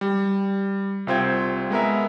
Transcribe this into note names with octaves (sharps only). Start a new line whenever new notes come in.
G3
C2 C4 F4 C5 G5 G#6
G#3 B3 A#4 E5